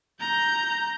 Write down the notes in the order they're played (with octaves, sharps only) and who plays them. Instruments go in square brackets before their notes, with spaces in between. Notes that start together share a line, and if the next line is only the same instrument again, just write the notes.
[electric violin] A#5 G6